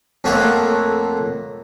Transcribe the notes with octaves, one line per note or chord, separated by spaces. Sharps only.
F2 F3 A3 A#3 F#4 C#5